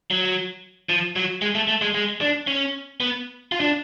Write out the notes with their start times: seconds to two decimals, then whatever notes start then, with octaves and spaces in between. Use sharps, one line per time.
0.11 F#3
0.89 F3
1.16 F#3
1.42 G#3
1.55 A3
1.68 A3
1.82 G#3
1.94 G#3
2.21 D4
2.47 C#4
3.00 B3
3.52 F4
3.60 D4